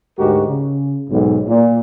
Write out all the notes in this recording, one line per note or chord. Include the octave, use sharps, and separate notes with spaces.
D2 G#2 G#3 F#4 G4 A#4
C#3
B1 G#2
A#2